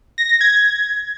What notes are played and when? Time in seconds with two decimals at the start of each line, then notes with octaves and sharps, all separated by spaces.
0.18 A#6
0.29 A#6
0.41 G#6